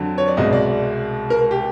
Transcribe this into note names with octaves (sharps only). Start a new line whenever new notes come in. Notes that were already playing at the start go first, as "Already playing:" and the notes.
Already playing: F2 D3 F#3
C#5
D5
C2 B2 G#3 D#5
D5
A#4
G4